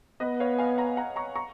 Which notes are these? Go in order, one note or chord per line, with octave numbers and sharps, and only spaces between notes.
B3 B4 D#5
C#5 F5
F5 G#5
F#5 A#5
F#5 A#5
A#5 C#6
A#5 C#6